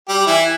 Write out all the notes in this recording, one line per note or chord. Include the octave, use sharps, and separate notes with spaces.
G3 G4
E3 E4